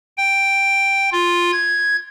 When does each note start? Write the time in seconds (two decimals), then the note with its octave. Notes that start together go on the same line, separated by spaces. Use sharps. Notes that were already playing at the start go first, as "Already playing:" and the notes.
0.18 G5
1.12 F4
1.52 G#6